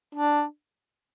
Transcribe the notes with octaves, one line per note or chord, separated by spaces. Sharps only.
D4